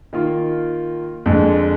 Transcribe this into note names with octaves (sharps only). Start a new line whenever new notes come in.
D#3 A#3 F4
F2 D3 G#3